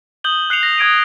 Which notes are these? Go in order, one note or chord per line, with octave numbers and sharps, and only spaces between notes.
D#6 G6 F#7 G7
F#6 C7 C#7 F7
A#6
D#6 G#6 D7 D#7